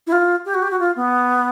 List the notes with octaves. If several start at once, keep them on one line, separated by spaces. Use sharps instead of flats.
E4
F4
G4
F#4
G4
F#4
F4
B3